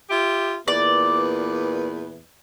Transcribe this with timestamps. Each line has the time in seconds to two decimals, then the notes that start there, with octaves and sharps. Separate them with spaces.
0.10 F4 G4 E5
0.68 E2 A#2 B4 D5